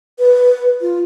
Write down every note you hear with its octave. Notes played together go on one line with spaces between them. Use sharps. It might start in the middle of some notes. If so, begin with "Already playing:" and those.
B4
F4